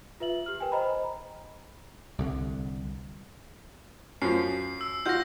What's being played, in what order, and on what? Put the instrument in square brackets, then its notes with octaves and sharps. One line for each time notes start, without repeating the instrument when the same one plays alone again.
[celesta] F4 B4 E5 F#7
G4 F6
A#4 B4 G5 G#5
C5 D#5 A#5 B5
[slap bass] C2 D3
[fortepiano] F#2 F3 [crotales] C7
[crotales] E6
[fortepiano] F4 F#4 [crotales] G6 A#6